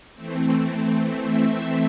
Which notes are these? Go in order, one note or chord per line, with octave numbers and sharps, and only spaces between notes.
E3 A3 C4
E5